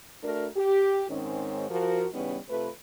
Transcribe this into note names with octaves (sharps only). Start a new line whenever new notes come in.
A3 D4 F#4 A#4
G4
G#2 D#3 G#3 C4 C#4
F3 F#4 A#4
C#3 E3 G3 B3 C#4 D#4
C3 A3 F4 B4